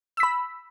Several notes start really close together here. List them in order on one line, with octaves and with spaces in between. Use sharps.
E6 B6 B5